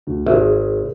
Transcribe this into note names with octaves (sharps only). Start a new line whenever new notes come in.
D2
G#1 G#4 E5